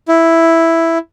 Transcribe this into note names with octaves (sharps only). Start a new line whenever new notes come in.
E4